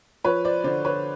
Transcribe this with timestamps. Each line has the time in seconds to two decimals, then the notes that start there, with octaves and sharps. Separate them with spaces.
0.24 F3 B4 C#5
0.45 C5 D5
0.64 D3 C5 D5
0.85 B4 C#5